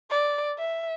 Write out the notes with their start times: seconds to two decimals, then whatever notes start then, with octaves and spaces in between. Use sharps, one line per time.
0.11 D5
0.58 E5